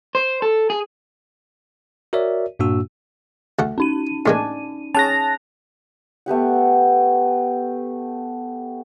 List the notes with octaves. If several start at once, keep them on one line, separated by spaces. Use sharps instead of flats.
C5
A4
G#4
F#4 A#4 C#5 D5 E5
G2 A#2 A#3 D4 F#4 E6
D2 A3 F#5
C#4 D#4 D#7
A2 G#3 A#3 D4 G#5
C#4 G#4 A5 F#6 A#6 F7
A3 B3 G4 F#5